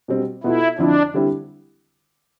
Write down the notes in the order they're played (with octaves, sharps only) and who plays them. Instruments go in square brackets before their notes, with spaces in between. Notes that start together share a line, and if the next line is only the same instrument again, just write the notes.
[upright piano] B2 G3 C4
[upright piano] B2 B3 F4 A4 [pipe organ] E4
[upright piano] F2 D3 F3 C4 E4 [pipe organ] D4
[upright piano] D3 G3 C4 E4 G4